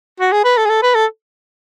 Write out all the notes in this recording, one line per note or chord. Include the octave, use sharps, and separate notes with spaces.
F#4
G#4
B4
A4
G#4
A4
B4
A4